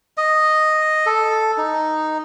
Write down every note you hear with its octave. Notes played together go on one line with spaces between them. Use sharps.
D#5
A4
D#4